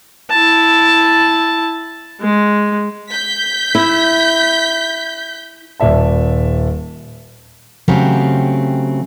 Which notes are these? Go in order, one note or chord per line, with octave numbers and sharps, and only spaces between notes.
E4 A5
G#3
G6 B6
E4
D#1 D5 E5 A5
C#3 F#3 A3 C4 G4